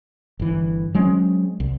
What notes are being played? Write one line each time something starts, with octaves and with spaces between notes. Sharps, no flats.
G1 E3
F#3 G#3 C4 C#4
C2